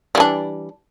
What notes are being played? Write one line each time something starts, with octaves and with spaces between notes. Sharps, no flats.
E3 G3 D4